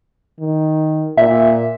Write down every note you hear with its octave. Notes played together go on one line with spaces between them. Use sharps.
D#3
A#2 E5